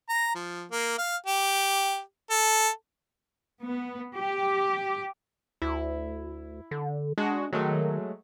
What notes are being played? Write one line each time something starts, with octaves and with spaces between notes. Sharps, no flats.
A#5
F3
A#3
F5
G4
A4
B3
G4
D2 E4
D3
G#3 D4 F#4
D#3 F#3 G#3 A3